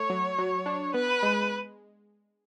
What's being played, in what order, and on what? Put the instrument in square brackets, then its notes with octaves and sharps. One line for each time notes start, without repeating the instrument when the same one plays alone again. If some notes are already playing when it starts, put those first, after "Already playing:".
Already playing: [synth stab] A3 [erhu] C#5
[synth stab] F#3
F#3
D4
[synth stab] B3 [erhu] B4
[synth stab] G#3